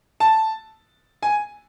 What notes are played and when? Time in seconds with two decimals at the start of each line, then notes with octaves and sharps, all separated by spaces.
0.20 A5
1.23 G#5